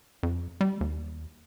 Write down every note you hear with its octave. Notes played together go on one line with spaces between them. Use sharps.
F2
G3
D#2